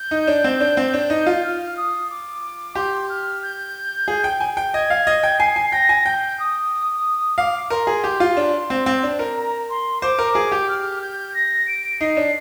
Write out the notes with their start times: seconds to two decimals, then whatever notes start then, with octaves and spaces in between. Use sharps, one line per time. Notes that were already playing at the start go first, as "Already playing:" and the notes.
Already playing: G6
0.11 D#4
0.27 D4
0.44 C4
0.61 D4
0.77 C4
0.93 D4
1.10 D#4
1.26 F4
1.43 F6
1.77 D#6
2.09 D6
2.75 G4 C6
3.08 F6
3.42 G6
4.08 G#4
4.24 G5
4.40 G#5
4.57 G5
4.74 D#5 G#6
4.90 F5
5.07 D#5
5.23 G5
5.39 G#5 C7
5.56 G#5
5.72 G5 A#6
5.89 G#5
6.06 G5 G6
6.39 D#6
7.38 F5 D6
7.70 A#4 C6
7.87 G#4
8.04 G4
8.20 F4
8.37 D4
8.70 C4
8.86 C4
9.03 D4
9.19 A#4
9.36 A#5
9.70 C6
10.01 C5 D6
10.19 A#4
10.35 G#4
10.52 G4
10.68 F6
11.01 G6
11.34 A#6
11.67 D7
12.00 D#4 C7
12.17 D4